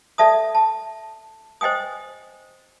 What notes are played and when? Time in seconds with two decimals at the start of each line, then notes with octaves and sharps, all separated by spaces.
0.18 A4 D5 E5 A5 D#6
0.55 A5
1.61 C5 D#5 G5 G#5 D#6